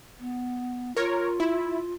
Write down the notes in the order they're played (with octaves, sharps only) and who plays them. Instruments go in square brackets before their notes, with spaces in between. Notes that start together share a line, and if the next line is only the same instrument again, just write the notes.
[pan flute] B3
[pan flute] F4 [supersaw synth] A#4 C#5
[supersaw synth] E4